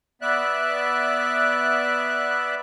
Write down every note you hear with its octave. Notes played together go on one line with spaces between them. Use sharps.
B3 D5 E5 F#6